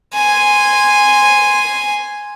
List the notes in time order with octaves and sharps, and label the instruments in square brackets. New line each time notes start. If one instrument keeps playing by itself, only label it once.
[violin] G#5 C6